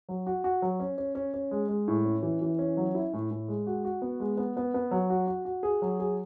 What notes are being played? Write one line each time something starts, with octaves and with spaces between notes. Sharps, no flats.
F#3
F#4
F#4
F#3
C#4
C#4
C#4
C#4
G#3
G#3
A2
C#4
E3
E3
C#4
F#3
E4
A2
A2
G#3
F#4
F#4
B3
G#3
B3
B3
B3
F#3
F#4
F#4
F#4
G#4
F#3
G#4